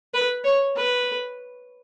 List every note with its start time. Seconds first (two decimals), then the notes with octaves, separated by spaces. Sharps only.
0.14 B4
0.45 C#5
0.76 B4